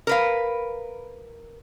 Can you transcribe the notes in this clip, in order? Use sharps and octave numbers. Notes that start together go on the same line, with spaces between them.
A#4 B4 F5